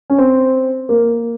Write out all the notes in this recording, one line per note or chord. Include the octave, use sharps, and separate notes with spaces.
C#4
C4
A#3